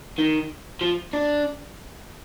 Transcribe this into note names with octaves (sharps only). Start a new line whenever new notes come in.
D#3
F3
D4